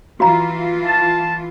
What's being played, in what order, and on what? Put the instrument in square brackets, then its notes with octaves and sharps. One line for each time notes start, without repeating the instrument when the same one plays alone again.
[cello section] E3 F4 [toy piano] F#4 F5 A#5
[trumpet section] A5